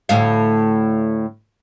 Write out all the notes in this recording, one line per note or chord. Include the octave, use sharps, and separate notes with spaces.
D2 A2 F5